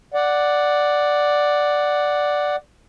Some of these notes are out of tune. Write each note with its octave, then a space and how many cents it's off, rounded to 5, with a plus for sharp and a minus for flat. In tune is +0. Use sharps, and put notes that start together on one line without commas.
D5 +0 F#5 +0